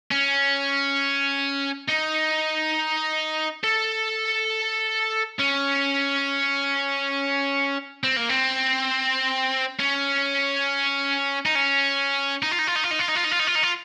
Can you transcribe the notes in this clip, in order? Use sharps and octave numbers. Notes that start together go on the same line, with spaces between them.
C#4
D#4
A4
C#4
C4
A#3
C4
C#4
D#4
C#4
D#4
F4
D#4
F4
D#4
F4
D#4
F4
D#4
F4
D#4
F4
D#4
F4
D#4
F4